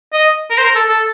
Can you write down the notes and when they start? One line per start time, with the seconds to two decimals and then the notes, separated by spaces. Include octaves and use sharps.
0.13 D#5
0.51 A#4
0.58 C5
0.65 A#4
0.76 A4
0.89 A4